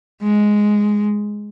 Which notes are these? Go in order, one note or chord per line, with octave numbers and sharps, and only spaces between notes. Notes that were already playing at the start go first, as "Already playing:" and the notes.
G#3